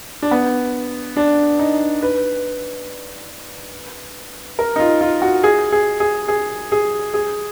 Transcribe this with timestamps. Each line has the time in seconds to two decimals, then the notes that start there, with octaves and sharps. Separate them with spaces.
0.22 D4
0.31 B3
1.17 D4
1.59 D#4
2.03 B4
4.59 A#4
4.76 D#4
4.80 F4
5.01 F4
5.22 F#4
5.44 G#4
5.72 G#4
6.00 G#4
6.28 G#4
6.72 G#4
7.14 G#4